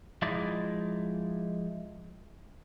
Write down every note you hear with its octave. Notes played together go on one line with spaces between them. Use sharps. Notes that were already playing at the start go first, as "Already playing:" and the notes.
F3 G#3 D#4 E4 D5